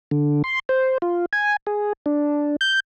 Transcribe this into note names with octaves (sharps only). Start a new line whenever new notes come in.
D3
C6
C5
F4
G#5
G#4
D4
G6